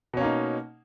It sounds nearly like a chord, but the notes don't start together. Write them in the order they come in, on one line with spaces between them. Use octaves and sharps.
B2 C#4 A#3 D#4